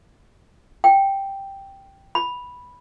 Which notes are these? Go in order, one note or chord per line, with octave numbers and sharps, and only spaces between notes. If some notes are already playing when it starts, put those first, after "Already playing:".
G5
B5